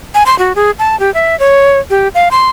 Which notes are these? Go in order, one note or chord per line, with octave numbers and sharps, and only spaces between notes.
G#5
C6
F#4
G#4
A5
G4
E5
C#5
G4
F5
C6